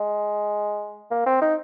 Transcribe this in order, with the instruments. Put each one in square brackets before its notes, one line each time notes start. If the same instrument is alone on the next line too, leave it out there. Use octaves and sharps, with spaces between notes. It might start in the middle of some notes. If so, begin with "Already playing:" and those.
Already playing: [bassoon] G#3
A#3
C4
D#4